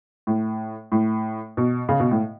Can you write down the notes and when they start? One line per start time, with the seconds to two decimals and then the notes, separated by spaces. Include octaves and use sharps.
0.27 A2
0.92 A2
1.57 B2
1.89 C#3
2.00 B2
2.11 A2